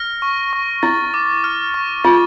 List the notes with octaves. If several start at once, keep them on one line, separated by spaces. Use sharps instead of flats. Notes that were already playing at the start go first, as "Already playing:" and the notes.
Already playing: F6 A#6
C#6
C#6
E4 A6
D6
F6
C#6
F4 A6